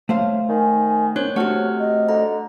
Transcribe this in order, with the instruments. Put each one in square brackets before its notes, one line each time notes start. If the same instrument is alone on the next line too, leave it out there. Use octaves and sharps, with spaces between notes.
[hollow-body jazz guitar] A3 C5 F5 [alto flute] C#5
[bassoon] D#3 [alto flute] G#5
[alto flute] B3 [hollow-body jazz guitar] D4 [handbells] C5 C#5 F#6
[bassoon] C3 [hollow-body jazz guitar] A3 F#4 [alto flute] C#5 [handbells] F#5 F6
[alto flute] D#5
[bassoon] D3 [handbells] A#5